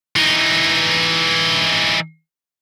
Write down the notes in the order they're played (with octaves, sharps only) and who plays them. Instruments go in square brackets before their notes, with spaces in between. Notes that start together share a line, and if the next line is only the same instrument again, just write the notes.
[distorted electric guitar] E3 D#4